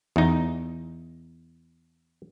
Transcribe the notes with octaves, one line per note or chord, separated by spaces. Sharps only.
E2 D#4